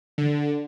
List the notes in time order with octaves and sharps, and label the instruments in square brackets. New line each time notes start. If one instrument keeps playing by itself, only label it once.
[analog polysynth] D3